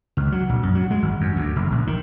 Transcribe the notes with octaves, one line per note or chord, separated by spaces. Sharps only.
C#2
F#3
A#1
F#2
F#3
G#3
G#1
F#2
D2
F#1
A#1
D#3